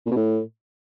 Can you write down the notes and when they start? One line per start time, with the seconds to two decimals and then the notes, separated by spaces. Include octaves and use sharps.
0.06 A#2
0.11 B2
0.16 A2